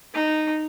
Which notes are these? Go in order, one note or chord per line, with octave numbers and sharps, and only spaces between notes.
D#4